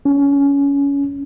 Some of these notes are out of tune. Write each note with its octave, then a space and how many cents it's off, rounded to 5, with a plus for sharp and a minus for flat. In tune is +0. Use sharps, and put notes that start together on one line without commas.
C#4 +20